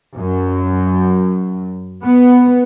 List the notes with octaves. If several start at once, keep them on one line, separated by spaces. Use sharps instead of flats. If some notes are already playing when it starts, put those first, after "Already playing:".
F#2
B3